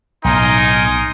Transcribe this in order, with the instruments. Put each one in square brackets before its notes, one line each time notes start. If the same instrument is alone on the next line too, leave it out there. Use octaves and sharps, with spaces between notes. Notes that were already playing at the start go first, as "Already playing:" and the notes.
[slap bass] B1 A2 [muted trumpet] D#4 [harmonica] A#4 G#5 C6